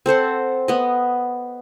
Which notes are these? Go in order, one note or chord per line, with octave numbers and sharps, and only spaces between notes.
C4 A4 C5 F#5
B3 D#5